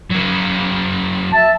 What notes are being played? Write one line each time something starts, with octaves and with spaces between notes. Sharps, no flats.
F#3 A#3
E5 A5